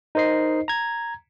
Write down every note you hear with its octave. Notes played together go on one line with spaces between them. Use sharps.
D#4 A#4 C5 D#5 C7
A#5 G#6